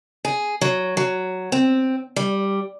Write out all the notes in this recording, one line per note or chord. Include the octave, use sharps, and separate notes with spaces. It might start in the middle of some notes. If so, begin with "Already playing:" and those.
G#4
F#3
F#3
C4
G3